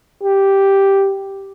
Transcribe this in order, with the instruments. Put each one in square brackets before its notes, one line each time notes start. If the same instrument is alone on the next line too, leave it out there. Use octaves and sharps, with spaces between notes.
[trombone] G4